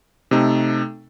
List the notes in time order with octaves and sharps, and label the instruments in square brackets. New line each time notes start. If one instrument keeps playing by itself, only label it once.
[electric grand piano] C3 A3 D#4 A4